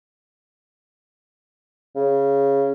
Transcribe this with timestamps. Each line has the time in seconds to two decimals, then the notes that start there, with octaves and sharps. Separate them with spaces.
1.96 C#3